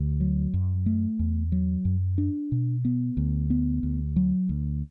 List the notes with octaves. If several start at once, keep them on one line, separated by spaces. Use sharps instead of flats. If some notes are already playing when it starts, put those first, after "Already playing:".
Already playing: D2
F#3
F#2
A3
E2
F#3
F#2
D4
B2
B3
D2
B3
D2
F#3
D2